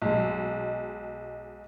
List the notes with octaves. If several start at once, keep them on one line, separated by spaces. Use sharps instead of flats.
B1 G#3